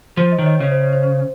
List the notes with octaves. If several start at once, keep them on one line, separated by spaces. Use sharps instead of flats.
F3 C5
D#5
D#3 C#5
D#5
C#3 C#5
C5
C5
C5
C5